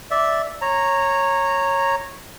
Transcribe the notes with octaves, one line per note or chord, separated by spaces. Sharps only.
D5 E5
C#5 A#5